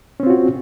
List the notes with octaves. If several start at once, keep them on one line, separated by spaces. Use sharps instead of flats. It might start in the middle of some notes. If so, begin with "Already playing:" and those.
C4 C#4 F4 F#4